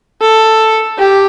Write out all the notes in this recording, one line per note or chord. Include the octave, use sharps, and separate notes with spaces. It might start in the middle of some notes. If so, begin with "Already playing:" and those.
A4
G4